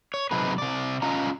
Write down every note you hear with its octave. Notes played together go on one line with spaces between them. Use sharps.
C#5
C3 F#3 D#4 G#4 B4
C3 D5
C#4 F4 D#5 A#5